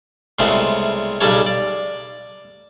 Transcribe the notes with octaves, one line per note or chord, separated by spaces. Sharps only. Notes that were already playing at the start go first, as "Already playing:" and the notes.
C2 C#3 G#3 A3 B3 C4
B1 C#3 G3 G4 A4 C#5
D5